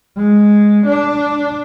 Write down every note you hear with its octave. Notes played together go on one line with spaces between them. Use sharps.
G#3
D4